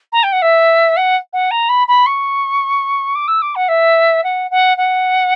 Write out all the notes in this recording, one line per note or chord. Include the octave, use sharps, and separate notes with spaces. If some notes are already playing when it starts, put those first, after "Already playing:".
A#5
G5
F#5
E5
F#5
F#5
A#5
B5
B5
C#6
D6
E6
D6
F#5
E5
F#5
F#5
F#5